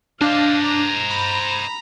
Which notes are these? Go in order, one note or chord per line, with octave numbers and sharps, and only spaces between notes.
D4 C5 D#5 F5
A#5
B5